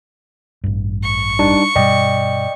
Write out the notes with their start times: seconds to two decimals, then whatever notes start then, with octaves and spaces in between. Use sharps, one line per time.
0.64 A1 G2
1.04 C#6
1.39 G3 D4 D#4
1.76 G2 B2 G3 D5 D#5 G5